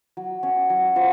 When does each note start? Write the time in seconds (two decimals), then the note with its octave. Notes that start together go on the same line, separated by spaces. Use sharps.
0.17 F#3
0.43 C#4
0.70 F#3
0.96 F4 C5